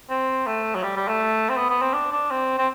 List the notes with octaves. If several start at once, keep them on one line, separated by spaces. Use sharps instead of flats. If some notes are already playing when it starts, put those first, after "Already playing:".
C4
A3
F#3
G3
G3
A3
C4
B3
B3
C4
D4
D4
C4
C4